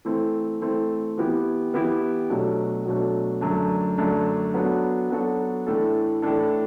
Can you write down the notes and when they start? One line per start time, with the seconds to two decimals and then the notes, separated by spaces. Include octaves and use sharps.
0.05 E3 A3 C4
0.62 E3 A3 C4
1.17 E3 B3 E4 G4
1.74 E3 B3 E4 G4
2.30 B2 F#3 A3 D4
2.86 B2 F#3 A3 D4
3.41 F#2 D3 A3 D4
3.98 F#2 D3 A3 D4
4.54 F#3 B3 D4 F#4 A4
5.10 F#3 B3 D4 F#4 A4
5.67 A2 E3 A3 D4 A4
6.22 A2 E3 A3 D4 A4